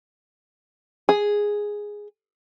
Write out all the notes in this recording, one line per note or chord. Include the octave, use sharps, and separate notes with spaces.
G#4